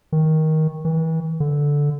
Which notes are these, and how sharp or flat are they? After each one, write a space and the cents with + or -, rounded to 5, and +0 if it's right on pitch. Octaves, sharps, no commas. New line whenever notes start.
D#3 +15
E3 -35
D3 -10